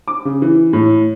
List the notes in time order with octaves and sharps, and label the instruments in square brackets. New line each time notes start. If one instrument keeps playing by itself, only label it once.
[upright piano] D6
C#3
E3
A2